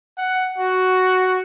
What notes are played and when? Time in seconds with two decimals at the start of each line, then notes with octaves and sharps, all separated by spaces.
0.18 F#5
0.58 F#4